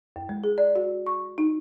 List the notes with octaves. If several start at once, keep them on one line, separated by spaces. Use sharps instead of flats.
F#2
G#3
G#4
D5
F#4
C#6
D#4